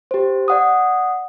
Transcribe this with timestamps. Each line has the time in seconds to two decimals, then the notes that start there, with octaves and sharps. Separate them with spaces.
0.11 G4 C5
0.48 D5 F#5 D#6